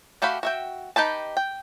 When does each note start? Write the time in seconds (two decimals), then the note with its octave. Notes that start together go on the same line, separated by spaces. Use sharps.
0.22 A3 F#4 G4 F5 B5
0.43 F#4 E5 G5
0.96 D#4 G4 B4 A5
1.37 G5